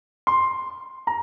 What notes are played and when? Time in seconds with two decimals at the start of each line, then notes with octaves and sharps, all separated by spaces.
0.27 C6
1.07 A#5